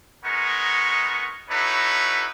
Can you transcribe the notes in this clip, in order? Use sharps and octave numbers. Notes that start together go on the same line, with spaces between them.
G#3 B3 D#4 A#4 C#6
D#4 E4 F#4 A4 B4 C#5